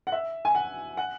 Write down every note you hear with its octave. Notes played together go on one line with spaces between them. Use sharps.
F#5
E5
G#5
F#5
F#5